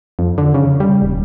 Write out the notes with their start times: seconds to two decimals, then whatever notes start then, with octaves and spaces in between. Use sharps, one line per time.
0.19 F2
0.38 D3
0.54 C#3
0.80 G3
1.02 D#1